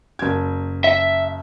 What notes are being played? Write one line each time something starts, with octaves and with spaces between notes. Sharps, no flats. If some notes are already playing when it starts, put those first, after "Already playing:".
F#1 G#6
E5